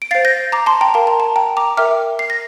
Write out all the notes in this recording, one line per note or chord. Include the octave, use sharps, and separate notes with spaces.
D7
C5 F5 A6 C7
G6 A#6
A#5 D6
A5 C6
G5 A#5
A#4 F5 A5
A#5
A5
G5 A#5
A#5 D6
A#4 E5 G5 D6 F6
C7
A#6